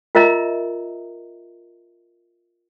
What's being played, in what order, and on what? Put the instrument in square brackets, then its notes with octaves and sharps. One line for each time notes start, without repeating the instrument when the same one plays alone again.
[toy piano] F4 A#4 D#5 E5 A#5